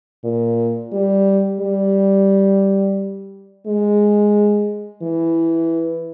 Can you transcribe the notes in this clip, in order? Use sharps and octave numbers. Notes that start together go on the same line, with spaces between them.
A#2
G3
G3
G#3
E3